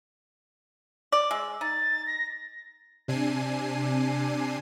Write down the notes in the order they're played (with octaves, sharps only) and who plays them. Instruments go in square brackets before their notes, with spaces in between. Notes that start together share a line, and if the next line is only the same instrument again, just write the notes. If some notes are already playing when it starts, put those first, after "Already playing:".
[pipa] D5
[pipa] G#3 [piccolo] E6
[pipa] D#4 [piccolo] A6
[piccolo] A#6
[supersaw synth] C3 D4 G#5 C7 D#7